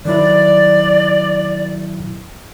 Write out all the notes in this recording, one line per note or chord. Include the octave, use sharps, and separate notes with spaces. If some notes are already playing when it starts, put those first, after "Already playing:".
D#3 F#3 E4 D5